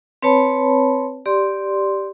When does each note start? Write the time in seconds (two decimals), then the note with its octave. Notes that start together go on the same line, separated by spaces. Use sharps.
0.22 C4 B4 C#5 A5 B5
1.26 G4 D5 C6